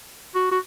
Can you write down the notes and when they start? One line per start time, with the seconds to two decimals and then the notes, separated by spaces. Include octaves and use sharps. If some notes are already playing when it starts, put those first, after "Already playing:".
0.35 F#4
0.51 F#4